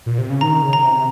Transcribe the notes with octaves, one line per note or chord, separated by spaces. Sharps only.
A#2
C3
C#3
D#3 A#5
C#3
A#5
C#3
C3